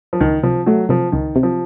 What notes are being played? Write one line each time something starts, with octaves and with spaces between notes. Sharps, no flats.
F3
C#2 D#3
C3 F3
F#3 A3
C3 F3
C#2 D#3
C3
F3